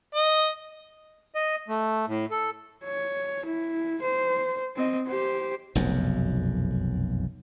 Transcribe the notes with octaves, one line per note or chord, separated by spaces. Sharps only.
D#5
D#5
A3
A2
A4
C#5
E4
C5
C4 D#5
G4 C5
F1 B1 F#2